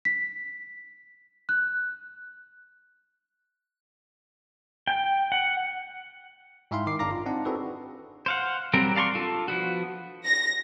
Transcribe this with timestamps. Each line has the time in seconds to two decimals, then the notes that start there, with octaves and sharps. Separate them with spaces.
0.05 B6
1.49 F#6
4.87 G5
5.32 F#5
6.71 G#2 E4 E5 F5 G5 C6
6.86 D#3 D#4 D6 C7
6.99 G1 D4 F5 A#5 D6 A#6
7.11 F4
7.26 C4 D4 D#4 F#5
7.45 C4 E4 F#4 G#4 A4 B4
8.26 C5 F5 F#5
8.73 F#3 G3 C4 A#4
8.95 D5 F5 A5 C6 C#6
9.15 D4 F4 A4
9.48 F3 B3 F#4
10.25 A#6